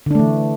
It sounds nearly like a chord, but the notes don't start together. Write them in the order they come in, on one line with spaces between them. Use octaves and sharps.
D3 D4 A3 E3